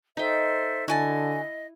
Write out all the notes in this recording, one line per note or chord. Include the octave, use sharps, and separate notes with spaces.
D#4 A4 C5 E5 G5
D3 E4 F#4 D#5 G#5 A5